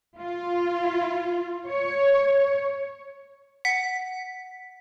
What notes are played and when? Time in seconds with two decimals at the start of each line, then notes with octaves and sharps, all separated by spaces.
0.19 F4
1.67 C#5
3.65 F#5 B6